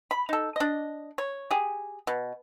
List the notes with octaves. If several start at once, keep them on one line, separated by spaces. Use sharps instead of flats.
B5
D#4 A4
D4 D#5
C#5
G4 G#4
B2